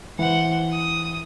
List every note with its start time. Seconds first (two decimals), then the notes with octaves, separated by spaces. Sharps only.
0.19 E3 C5 F#5
0.72 D#6